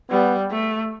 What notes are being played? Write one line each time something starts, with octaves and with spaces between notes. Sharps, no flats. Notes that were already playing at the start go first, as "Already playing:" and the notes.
G3 B3
A3